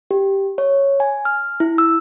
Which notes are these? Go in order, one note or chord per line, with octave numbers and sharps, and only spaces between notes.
G4
C#5
G#5
F6
E4
E6